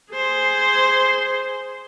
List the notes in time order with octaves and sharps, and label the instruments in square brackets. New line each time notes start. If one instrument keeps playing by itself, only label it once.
[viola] G#4 C5